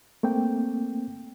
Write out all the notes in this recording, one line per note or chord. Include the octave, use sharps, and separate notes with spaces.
A3 A#3 C4 G5